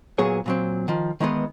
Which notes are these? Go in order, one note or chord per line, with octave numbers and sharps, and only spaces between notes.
A#2 F#3 B3 G#4 C#5
A#2 F#3 C4
D#3 F3
D#3 E3 G#3 B3